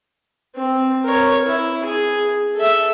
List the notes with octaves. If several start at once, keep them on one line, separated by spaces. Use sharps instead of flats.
C4
A#4 C#5
E4
G#4
A4 E5